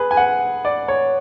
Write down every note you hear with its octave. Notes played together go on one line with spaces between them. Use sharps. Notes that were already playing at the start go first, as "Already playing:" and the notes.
Already playing: G#4 B4
G#5
F#5
D5
C#5